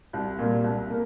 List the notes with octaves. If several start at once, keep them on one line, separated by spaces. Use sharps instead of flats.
C2
A#2 G3 A#3
C2
A#3